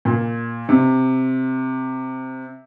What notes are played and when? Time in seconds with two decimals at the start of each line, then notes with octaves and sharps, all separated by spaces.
0.05 A#2
0.69 C3